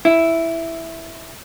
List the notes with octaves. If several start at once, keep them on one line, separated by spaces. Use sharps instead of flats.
E4